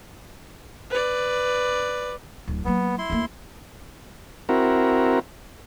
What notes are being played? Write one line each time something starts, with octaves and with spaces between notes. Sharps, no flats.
B4 D5
D1
F#3 A#3 B3
E4 C6
D2 A#3
C4 E4 F#4 A#4